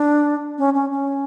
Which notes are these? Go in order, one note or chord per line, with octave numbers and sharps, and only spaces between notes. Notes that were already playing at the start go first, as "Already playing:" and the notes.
Already playing: D4
C#4
C#4
C#4